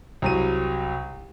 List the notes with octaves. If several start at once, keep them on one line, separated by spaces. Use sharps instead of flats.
C2 F#3 D#7